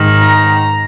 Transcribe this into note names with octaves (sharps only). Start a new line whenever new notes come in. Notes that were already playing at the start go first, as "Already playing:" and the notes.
Already playing: G#2 D#3
A#5